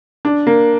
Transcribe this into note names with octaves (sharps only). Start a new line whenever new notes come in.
D4
A#3